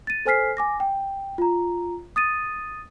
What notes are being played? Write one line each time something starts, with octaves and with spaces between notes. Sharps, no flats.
A6 D#7
A4 C5 G#5 F6 B6 C7
G#5 D6 A#6
G5
F4 A#5
D#6 A6 D#7